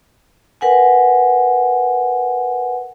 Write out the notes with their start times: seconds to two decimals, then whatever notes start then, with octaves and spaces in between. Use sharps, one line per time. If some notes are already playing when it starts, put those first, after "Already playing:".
0.61 A#4 B4 F#5 G#5